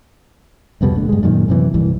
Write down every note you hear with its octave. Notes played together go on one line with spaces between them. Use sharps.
C2 F2 B2 G3
F#1 A2 D3
G2 G#3
F#2 A#2 D#3
F#2 C3 E3
C2 G2 E3